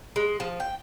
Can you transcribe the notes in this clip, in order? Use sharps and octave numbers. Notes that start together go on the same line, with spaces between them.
G#3
F3
G5